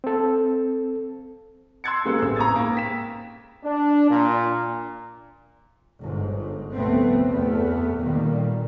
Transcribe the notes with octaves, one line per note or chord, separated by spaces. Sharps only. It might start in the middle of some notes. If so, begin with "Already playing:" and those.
C4 A4
C6 E6 F#6 G#6 A6 C#7
C#3 G3 G#3 A#3 B3 A4
A1 B3 C4 G#4 E6
A#5 C#6 D#6 E6 G#6 A6
G#2 A#3
G5 B6 E7
D4
A#2
G1 G#2
F1 C2 A3 B3 C4
F#1 E2 A3 B3
A#2 D3 D#3 G3 A#3